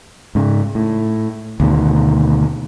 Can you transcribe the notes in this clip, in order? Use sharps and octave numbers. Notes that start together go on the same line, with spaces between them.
G#2 C#3
A2
D2 B2 D#3